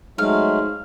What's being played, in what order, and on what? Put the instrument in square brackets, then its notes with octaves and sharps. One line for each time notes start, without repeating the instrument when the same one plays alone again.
[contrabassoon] G#2 [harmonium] F#3 G#3 A3 [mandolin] F5